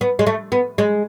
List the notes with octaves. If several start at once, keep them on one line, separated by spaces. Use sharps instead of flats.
B3
G#3
A3
B3
G#3